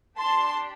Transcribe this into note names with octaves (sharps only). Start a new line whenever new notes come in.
D4 G4 A5 C6